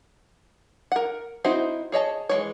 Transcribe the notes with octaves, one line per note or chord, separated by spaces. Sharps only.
A#4 F#5
C4 D#4 E4 F#4 C5
G#4 C#5 D#5 A5
E3 G#3 C#5